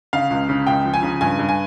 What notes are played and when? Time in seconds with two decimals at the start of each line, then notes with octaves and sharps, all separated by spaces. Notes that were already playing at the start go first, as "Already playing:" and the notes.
0.13 C#3 F5
0.30 C#2
0.49 C#3
0.67 C#2 G5
0.85 F3
0.94 G#5
1.03 C#3
1.21 G2 G#5
1.39 G2
1.49 G#5